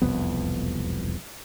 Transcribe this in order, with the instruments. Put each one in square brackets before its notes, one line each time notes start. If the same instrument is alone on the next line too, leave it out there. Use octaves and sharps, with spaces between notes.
[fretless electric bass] E1 C2 F2 B3